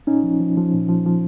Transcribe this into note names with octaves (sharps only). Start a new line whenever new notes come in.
A#2 C#4 D#4
F3
F3
F3
A#2
F3
F3